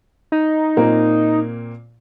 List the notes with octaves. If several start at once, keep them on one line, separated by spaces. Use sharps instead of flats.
D#4
A#2 A#3 C4